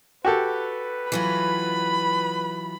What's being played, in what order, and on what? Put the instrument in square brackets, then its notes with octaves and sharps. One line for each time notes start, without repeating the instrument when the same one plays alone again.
[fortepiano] F#4 G4 A4 [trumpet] B4
[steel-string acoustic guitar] E3 F#3 F4 [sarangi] B5